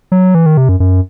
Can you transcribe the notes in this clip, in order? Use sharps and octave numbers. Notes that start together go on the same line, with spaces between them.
F#3
E3
D#3
C3
F#2
F#2